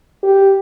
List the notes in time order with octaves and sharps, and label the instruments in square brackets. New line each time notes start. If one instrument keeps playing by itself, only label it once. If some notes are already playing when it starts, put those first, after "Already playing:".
[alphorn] G4